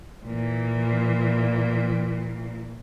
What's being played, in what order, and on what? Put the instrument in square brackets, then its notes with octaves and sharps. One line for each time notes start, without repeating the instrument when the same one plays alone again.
[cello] A#2 E3